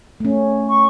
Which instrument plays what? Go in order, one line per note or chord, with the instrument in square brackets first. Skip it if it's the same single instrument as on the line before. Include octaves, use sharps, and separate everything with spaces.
[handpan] A3 C#4
[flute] C#6